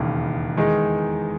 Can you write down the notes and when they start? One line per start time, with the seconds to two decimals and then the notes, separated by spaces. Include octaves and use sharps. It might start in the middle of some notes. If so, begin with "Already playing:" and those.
Already playing: E1 D#2 C#3
0.56 E2 D#3 G#3 D#4 G#4